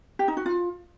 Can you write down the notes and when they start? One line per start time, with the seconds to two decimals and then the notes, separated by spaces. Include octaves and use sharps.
0.19 G4
0.28 D#4
0.37 F#4
0.46 F4